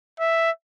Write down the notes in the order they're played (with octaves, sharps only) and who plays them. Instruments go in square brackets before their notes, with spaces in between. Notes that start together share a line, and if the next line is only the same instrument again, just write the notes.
[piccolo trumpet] E5